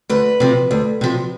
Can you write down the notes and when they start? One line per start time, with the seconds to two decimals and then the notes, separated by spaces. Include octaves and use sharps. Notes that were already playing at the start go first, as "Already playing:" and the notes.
0.09 D2 B4
0.40 C3 F3
0.71 D2
1.01 C3 F3